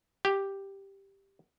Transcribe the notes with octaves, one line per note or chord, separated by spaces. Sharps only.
G4